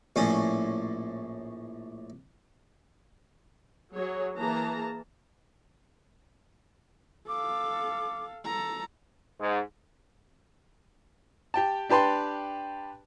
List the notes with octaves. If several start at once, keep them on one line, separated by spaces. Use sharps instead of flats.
A#1 A2 C#4
F#3 G#4 C#5
E3 A#3 G#4 A5 A#5
A4 F5 D6
A4 A#5
G#2
G4 G5 A5
D4 G4 B4 A5 C6